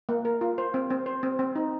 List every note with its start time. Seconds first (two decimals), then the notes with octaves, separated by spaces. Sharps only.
0.09 A#3
0.25 A#4
0.41 F4
0.58 C5
0.74 C4
0.90 C4
1.06 C5
1.23 C4
1.39 C4
1.56 D#4